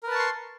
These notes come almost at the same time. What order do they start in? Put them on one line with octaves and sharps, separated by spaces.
A#4 B4 A5 C#6 C6